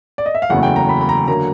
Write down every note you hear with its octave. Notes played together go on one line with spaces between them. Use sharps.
D5
D#5
E5
F5
F#1 E2 C#3 F#3 A3 F#5
G5
A#5
B5
B5
A#5
D3 F#3 A#3 A#5